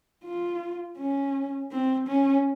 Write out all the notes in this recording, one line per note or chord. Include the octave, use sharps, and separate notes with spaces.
F4
C#4
C4
C#4